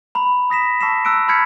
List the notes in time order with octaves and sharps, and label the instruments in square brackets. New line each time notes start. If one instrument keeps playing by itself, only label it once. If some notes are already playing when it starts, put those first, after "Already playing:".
[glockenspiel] A#5 B5
D#6 A#6 B6 E7
A5 C#6 E6 B6 C7 E7
A#5 E6 F#6 C#7 D7
B5 F6 G6 G#6 B6 C#7